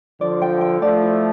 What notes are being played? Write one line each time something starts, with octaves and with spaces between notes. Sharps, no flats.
D3 F3 D5
G5
G5
F3 A3 D5
E4